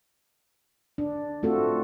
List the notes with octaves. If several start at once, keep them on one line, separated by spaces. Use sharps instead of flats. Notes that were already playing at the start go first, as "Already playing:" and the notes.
D4
A3 C4 F4 F#4 A4